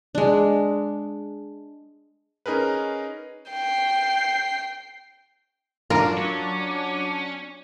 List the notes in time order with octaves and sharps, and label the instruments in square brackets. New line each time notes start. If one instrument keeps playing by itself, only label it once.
[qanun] G#3 D4
[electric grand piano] C#4 D#4 G#4 A#4 B4
[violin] G5 C7
[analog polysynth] F#3 D4 [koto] F4 A#4
[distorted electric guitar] C#4